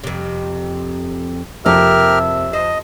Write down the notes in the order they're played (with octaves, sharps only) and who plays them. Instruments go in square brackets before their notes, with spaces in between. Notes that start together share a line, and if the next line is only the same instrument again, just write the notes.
[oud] F2 C3
[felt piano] F2 [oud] C3 A#3 [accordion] G4 A#4 F6 [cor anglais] E5
[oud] C5 [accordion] D#5